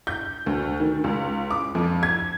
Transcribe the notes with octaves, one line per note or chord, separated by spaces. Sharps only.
G6
D2
D#3
C#2
D6
F2
G#6